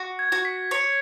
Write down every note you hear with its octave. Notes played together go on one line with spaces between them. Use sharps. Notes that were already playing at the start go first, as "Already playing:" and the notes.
Already playing: F#4
G#6
F#4
B6
C#5 C#7